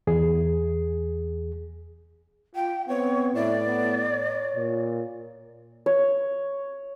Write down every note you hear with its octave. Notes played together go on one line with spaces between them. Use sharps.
E2 G#4
F4 G5
B3 C4 C#5
A2 E4 D5
B3
C#5
A#2
C#5